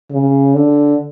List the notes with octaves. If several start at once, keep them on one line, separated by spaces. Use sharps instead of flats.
C#3
D3